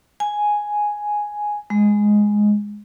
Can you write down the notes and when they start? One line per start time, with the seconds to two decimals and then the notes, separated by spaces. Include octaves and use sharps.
0.20 G#5
1.70 G#3